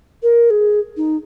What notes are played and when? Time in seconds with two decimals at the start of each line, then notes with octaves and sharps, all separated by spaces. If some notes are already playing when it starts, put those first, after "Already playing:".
0.23 A#4
0.50 G#4
0.97 D#4